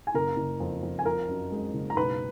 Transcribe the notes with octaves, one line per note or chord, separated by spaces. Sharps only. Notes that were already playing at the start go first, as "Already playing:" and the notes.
G#5
F#1 A#4 A#5
F#1
F2
F2
G#5
F3 A#4 A#5
F#2
G#3
F#1
A#5
B1 B4 B5